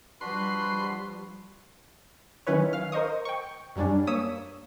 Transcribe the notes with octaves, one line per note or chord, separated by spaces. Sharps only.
F3 G3 D4 F#4 B4 B5 C6
D#3 F#3 C#4 E4 B4 C#5
F5 F6
A#4 C5 D#5 C#6 D#6
G5 C#6
F#2 F#3 G3 C#4 D4
A#3 C#5 D#6 E6 B6 E7